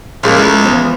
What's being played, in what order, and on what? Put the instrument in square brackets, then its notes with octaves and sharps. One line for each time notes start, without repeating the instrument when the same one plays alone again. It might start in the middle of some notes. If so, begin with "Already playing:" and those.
[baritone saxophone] C#2 [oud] F3 G#3 A#3
[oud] G#3 A3 E4
E3 F3 B3